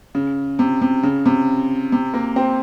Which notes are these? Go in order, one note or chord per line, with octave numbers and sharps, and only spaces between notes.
C#3
C3
C3
C#3
C3
C3
A#3
C4